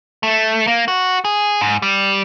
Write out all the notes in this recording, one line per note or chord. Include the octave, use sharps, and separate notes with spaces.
A3
A#3
F#4
G#4
G#2
G3